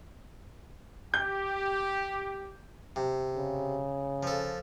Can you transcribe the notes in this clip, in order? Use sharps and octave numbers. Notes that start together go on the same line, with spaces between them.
G4 G6
C3
C#3
F3 A4